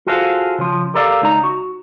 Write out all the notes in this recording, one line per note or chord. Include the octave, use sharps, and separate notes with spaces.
F4 F#4 G#4 A4 C5 F5
C#3 F3
G4 A4 A#4 D5 D#5 F5
C#2 D#4 A#5
F#4